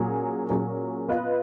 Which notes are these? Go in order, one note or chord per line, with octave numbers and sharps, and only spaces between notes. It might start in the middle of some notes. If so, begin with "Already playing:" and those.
Already playing: A#2 F#3 C#4 G#4
A#2 F#3 C#4 G#4
B3 F4 B4 D#5